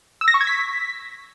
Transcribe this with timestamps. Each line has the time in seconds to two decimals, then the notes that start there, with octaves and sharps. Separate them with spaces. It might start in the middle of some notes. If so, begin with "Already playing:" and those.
0.21 E6
0.28 A#6
0.34 C#6
0.41 G#6
0.47 B6